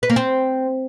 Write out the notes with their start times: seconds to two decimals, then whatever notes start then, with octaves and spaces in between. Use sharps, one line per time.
0.03 B4
0.10 A#3
0.16 C4